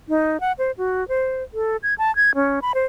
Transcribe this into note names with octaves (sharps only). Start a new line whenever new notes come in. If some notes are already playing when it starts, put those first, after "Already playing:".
D#4
F#5
C5
F#4
C5
A4
G#6
A5
G#6
C#4
B5
C5